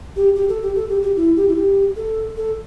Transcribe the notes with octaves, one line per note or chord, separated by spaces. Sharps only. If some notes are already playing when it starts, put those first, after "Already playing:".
G4
G4
A4
G4
A4
G4
G4
E4
G4
E4
G4
A4
A4